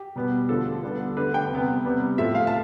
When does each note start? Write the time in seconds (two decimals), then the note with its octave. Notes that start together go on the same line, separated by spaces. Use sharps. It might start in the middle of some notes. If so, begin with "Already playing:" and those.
Already playing: G4
0.16 B2 G3 B3
0.49 D3 F3 A3 A4
0.83 D3 G3 B3
1.17 D3 A3 B4
1.34 G5
1.51 C3 G3 B3
1.85 C3 G3 B3
2.18 A2 F3 A3 E5
2.35 F5
2.47 A5